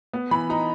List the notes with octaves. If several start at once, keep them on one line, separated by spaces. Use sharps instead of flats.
B3
E3 B5
D#4 A#5